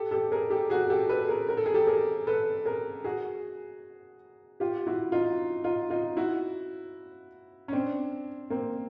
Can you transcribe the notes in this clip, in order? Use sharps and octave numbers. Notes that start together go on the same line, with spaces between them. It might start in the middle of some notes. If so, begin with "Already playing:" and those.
Already playing: G4 A4
G4 A4
G#4 A#4
G4 A4
F#4 G#4
G4 A4
A4 B4
G#4 A#4
A#4
A4
G#4
G4 A4
G#4 A#4
A4 B4
G#4 A#4
F#4 G#4
F4 G4
E4 F#4
D#4 F4
D#4 F4
D#4 F4
E4 F#4
C#4
C4 D4
A#3 C4